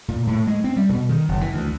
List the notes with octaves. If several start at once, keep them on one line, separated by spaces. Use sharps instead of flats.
A#2
A2
G#3
C4
G3
B2
D#3
F#1
E3
D2